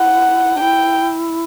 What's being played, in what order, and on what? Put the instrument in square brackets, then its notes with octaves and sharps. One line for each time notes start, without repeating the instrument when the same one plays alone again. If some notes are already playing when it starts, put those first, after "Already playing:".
Already playing: [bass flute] E4 [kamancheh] F#5
[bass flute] D4
[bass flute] E4 [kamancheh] G5